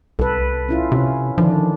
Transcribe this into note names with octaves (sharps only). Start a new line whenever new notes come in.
C2 A4 B4
C#4 E4 F4
C3 C#4
D3 D#3 F3 D4